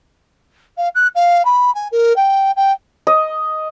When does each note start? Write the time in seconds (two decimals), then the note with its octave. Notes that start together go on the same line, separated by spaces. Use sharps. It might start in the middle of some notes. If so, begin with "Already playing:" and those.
0.77 F5
0.95 F#6
1.15 F5
1.45 B5
1.74 G#5
1.91 A#4
2.16 G5
2.56 G5
3.07 D#5